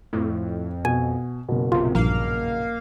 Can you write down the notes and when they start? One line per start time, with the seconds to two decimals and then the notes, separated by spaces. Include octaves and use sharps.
0.13 F2 A2
0.85 B2 G#5
1.49 F#1 B2
1.72 A#1 C3 F4
1.95 A#1 G2 A#3 F5